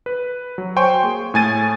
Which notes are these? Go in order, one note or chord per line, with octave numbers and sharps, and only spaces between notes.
B4
F#3
C5 C#5 G5 G#5 C6 C#6
A#3 G#4
A2 A3 G#5 G#6 A6 D#7